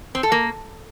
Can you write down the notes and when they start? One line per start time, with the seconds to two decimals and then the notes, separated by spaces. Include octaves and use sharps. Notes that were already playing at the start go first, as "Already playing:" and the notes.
0.15 C4
0.23 A4
0.32 A#3